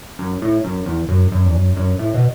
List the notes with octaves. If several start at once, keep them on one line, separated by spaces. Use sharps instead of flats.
F#2
A2
F#2
E2
F#2
F#2
E2
F#2
F#2
A2
B2